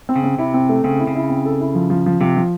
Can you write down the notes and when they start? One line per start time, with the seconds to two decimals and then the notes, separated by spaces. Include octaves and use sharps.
0.09 C4
0.16 C#3
0.24 C4
0.38 C3 E4
0.54 C4
0.69 A3
0.84 C#3 C4
1.00 E4
1.07 C#3
1.15 E4
1.29 C4
1.45 A4
1.60 E4
1.75 F3
1.90 F3
2.06 F3
2.21 C3 F3
2.37 F3